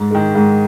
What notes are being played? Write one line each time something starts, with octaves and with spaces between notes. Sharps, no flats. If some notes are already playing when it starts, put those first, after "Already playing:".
Already playing: G#2
D#3 G#3
G#2